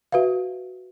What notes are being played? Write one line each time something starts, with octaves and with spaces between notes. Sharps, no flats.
F#4 B4 E5 F5